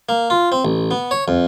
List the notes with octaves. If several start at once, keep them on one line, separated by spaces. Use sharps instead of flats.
A#3
F4
C4
A1
B3
C#5
F2